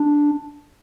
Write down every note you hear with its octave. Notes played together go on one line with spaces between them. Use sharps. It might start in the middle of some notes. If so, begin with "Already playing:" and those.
Already playing: D4